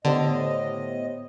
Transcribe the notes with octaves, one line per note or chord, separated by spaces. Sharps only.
A2 D3 B3 G4 C5 D#5